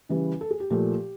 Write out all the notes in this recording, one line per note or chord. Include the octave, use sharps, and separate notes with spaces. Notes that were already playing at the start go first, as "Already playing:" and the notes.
C#3 E3 G3 B4
A4
G#4
G4
A#2 F3 A3 G4